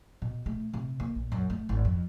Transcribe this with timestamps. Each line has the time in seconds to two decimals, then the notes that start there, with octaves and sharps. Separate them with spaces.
0.22 B2
0.46 A3
0.73 C3
1.00 A#3
1.15 A#1
1.32 F#2
1.50 A3
1.69 G#1
1.85 F2